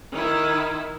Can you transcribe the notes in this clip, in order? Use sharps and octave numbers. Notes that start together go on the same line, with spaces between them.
D#3 E4